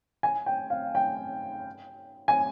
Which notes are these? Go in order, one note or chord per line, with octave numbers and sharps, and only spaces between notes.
G#5
G5
F5
G5
G#5